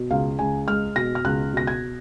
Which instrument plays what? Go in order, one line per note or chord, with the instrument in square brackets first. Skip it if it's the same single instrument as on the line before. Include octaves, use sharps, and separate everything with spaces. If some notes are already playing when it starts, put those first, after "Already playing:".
Already playing: [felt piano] B2
C#2 F5
C#2 G#5
G#3 F6
B2 A#6
F6
C#2 F#6
B2 A#6
G#6